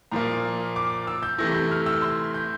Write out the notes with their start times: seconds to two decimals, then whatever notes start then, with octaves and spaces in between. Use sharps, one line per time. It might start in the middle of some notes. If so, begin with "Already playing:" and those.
0.11 A#2 F3 A#3 A#5
0.76 D6
1.07 E6
1.23 G6
1.38 C3 E3 A3 E4 A#6
1.55 G6
1.71 F6
1.86 E6
2.02 C6
2.34 G6